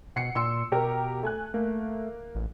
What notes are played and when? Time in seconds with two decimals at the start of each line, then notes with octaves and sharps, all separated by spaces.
0.16 B2 F#5 C7 C#7
0.35 A#2 C6 E6 C#7
0.72 B2 G4 A#4 A#5
1.23 A3 G#5 F#6
1.54 A3 A#3
2.35 A1